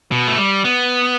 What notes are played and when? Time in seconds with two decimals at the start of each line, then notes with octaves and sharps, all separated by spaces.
0.11 B2
0.27 A3
0.38 G3
0.64 B3